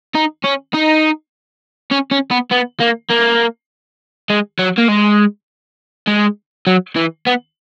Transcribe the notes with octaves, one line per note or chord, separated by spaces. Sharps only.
D#4
C#4
D#4
C#4
C#4
B3
B3
A#3
A#3
G#3
F#3
A#3
G#3
G#3
F#3
E3
B3